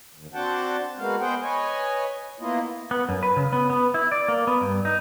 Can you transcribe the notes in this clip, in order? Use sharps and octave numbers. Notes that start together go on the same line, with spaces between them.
D#2
C4 D4 F#4 F#5 G5 A5
G#3 A#3 B3 F#4 F5
G#3 B3 G#4 C5 F#5 G5
B4 C#5 D#5 G#5
A#3 B3 E4 F4 D#5
B3
F#2
B4
C#3
B3
B3
E4
D5
A#3
B3
G2
D#4